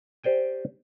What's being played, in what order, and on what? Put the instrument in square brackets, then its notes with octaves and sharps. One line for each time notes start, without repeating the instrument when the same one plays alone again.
[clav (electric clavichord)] G4 C5 D5 G5 G#5